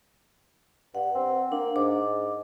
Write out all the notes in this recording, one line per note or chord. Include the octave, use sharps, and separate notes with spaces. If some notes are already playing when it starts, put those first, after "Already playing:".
G2 F#5
C4
A#3 D4
G#2 D6